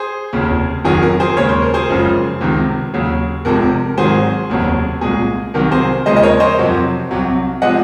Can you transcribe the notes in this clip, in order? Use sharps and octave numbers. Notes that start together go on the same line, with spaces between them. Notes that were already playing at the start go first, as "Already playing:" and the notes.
Already playing: G#4 C5
F1 D#2 C#3
F#1 F2 D#3 F#3 G#4
A#4
G#4 C5
D#2 C#3 G#3 C#5
C5
A#4
G#4 C5
F#1 F#2 C#3 F3 G#3
C#2 C3 D#3
D#2 C#3 F#3
F1 F2 C3 F3 G#3 A#4
G#1 G#2 D#3 F#3 G#4 C5
F1 D#2 C#3 F#3
C2 A#2 G#3 G#4
C2 C3 D#3 F#3 A#4
G#4 C5
D#2 C#3 F3 G#3 C5 D#5
D#5
A#4 C#5
C5 D#5
F2 C3 F#3
C2 C3 F#3
C3 F3 G#3 D#5 F#5